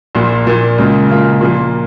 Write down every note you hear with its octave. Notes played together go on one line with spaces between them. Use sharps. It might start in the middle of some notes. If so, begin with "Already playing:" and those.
A#1 A#2 A#3
A#1 A#2 A#3
C#2 C#3 A#3 F4
C#2 C#3 A#3 F4
A#2 F3 A#3